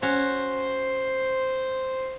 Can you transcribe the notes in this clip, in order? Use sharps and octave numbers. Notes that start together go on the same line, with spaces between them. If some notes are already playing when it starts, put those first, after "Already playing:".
C#4 F#4 C5